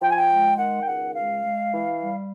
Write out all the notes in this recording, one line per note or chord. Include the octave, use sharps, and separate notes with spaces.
F3 G5
G#5
G5
G#3
D#3 F#5
G5
C#2 F#5
G#3 F5
G#3
E3
G3